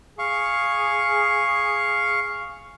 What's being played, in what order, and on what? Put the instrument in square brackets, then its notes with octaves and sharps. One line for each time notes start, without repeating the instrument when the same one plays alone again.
[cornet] G#4 [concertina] F5 C#6